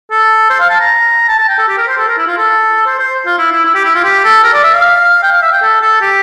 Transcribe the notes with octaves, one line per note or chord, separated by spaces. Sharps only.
A4
C5
F5
A5
A#5
A5
A5
G5
A4
G4
A#4
C5
A4
A#4
E4
F4
A4
C5
C5
F4
E4
E4
E4
G4
E4
F4
G4
A4
A#4
D5
E5
F5
G5
F5
E5
G5
A4
A4
G4